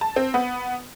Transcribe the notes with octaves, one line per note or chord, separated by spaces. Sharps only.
A5
C4
B3